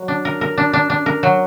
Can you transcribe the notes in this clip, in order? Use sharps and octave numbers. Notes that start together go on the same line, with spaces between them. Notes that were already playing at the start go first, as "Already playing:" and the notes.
Already playing: F#3
D4
A#4
A#4
D4
D4
D4
A#4
F#3